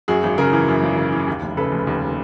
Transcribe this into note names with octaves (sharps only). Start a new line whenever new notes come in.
F#2 F#4 G#4
G#1
C#3 G#4 A#4
E3
F#2
G#1
C#3
E3
D#2
F1
C#3 A4 B4
F1
D#2